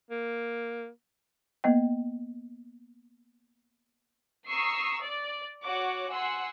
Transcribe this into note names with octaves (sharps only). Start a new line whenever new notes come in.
A#3
A#3 B3 D#5 G5
A#5 C#6 D#6 E6 C7
D5
F#4 C#5 F#5 D6
F#5 G#5 C6 E6